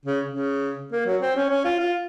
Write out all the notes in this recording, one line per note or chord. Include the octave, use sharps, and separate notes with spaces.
C#3
C#3
A#3
F#3
C4
C#4
C#4
F4
F4